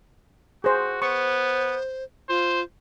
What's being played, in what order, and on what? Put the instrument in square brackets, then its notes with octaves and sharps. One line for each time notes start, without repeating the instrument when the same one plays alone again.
[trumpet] F#4 [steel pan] G#4 C5
[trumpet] B3 [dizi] C5 [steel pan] C#6
[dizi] F4 [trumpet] C5